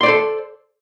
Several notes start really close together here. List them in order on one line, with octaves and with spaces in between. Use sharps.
C6 D5 C5 A4